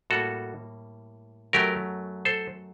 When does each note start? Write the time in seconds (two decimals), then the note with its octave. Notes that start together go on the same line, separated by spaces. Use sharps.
0.10 A2 G3 A#3 F#4 A4
1.53 F#2 F#3 A3 G4 A#4
2.25 A4 C5